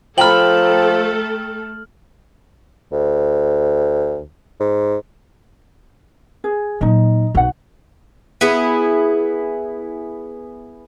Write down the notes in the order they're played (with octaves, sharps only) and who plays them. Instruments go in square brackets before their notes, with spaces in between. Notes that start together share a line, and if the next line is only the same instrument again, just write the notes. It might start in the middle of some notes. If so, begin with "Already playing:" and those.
[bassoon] F3 [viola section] A3 A4 [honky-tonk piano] G5 A#5 B5 [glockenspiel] F6 F#7
[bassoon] D2
G#2
[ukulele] G#4
[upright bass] A#2 F#3 [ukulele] D#4 D#5
[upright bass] B1 D#4 [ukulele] F#4 F#5
[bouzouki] B3 E4 G#4